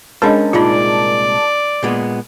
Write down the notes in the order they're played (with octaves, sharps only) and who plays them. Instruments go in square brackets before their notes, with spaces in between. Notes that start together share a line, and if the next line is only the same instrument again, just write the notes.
[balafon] G#3 D4 D#5 [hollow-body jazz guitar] C#4 C5 [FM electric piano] G#4 A#4 A5
[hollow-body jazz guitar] C2 A#2 G#3 [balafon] D#4 F4 [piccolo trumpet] D5
[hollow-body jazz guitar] A#2 G#3 B3